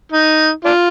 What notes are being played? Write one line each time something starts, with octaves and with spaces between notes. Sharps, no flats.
D#4
D4 F4